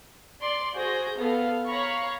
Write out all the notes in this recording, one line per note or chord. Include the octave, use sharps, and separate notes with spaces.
D5 C6
F#4 G#4 C5 G6 A#6
B3 A4 F5
C#5 F5 A#5 B5 C#6